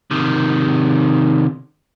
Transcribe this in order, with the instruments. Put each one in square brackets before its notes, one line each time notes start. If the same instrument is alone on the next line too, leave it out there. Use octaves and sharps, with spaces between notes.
[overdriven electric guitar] C3 D#3